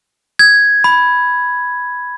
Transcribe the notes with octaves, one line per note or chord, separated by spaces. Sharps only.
G#6
B5